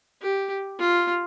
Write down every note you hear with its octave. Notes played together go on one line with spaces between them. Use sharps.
G4
F4